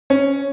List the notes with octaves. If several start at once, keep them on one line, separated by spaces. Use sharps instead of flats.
C#4